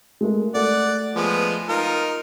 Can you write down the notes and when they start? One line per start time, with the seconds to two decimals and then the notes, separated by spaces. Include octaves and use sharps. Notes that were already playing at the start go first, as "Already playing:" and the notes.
0.21 G#3 A3 A#4
0.55 A3 D5 F#5
1.15 F3 G#3 B3
1.69 D#4 F4 A#4